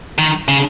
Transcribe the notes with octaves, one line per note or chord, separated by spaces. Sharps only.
D#3
C#3